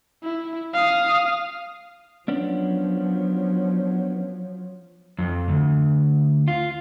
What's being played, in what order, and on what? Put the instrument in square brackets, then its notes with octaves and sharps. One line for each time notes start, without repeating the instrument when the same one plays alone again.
[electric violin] E4
F5 D#6
[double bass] F3 F#3 [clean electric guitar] B3 C#4 D4
[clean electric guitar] F2
D2
F4